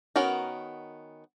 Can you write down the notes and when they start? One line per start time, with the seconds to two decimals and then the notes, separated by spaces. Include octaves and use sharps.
0.16 D#3 B3 C#4 F#4 A#4